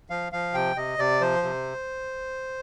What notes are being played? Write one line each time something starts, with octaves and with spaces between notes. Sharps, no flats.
F3 F5
F3 F5
C3 G5
C3 D#5
C3 D5
F3 C5
C3